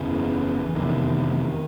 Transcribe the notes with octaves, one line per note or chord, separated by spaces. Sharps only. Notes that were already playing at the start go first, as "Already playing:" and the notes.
Already playing: F#1 E2 C#3 E3
F1 E2 C3 D#3